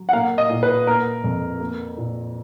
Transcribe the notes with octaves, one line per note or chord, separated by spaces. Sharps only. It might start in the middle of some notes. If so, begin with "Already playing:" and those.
Already playing: F#3
F#5
A#3 F5
D#5
A#2
B4
A#3 A#4
F2
A#3
A#2